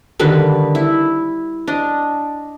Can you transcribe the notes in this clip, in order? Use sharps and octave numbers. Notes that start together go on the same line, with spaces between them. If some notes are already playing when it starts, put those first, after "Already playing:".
D3 D#3 G3 B4
E4
D4 D#5